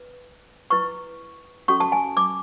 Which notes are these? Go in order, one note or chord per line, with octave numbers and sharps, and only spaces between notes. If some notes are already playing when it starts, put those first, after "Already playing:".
Already playing: B4
E4 B4 C#6
C#4 F#4 A4 C#6
A5
G#5
D6